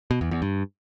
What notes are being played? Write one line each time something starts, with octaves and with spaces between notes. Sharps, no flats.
B2
E2
E2
G2